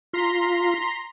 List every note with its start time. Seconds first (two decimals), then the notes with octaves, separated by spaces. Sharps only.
0.13 F4 A#5 C6 B6